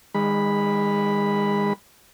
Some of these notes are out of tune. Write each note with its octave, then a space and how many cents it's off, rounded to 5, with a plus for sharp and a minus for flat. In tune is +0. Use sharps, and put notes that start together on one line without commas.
D#3 +0 G#3 -30 B5 +0